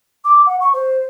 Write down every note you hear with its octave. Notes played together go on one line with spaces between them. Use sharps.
D6
F#5
C#6
C5